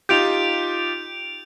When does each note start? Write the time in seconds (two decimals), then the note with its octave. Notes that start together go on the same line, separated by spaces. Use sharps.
0.09 D#4 F4 G4 G6 D7 F7